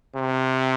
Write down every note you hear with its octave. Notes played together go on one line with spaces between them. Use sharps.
C3